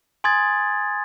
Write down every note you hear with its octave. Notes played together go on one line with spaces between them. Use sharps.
G#5 C6 D#6 G#6 A6